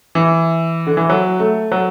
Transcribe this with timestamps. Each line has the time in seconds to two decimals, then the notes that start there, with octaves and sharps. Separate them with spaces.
0.15 E3
0.87 D3
0.97 E3
1.09 F#3
1.40 A3
1.72 F#3